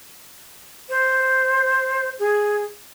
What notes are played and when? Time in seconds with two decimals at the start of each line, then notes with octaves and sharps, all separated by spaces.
0.89 C5
2.19 G#4